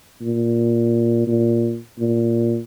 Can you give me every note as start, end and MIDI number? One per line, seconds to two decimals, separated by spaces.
0.22 1.23 46
1.27 1.79 46
1.99 2.59 46